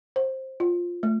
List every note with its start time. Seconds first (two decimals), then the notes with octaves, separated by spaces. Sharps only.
0.16 C5
0.60 F4
1.03 A3